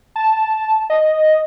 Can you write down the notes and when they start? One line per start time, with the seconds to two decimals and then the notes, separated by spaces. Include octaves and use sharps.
0.16 A5
0.90 D#5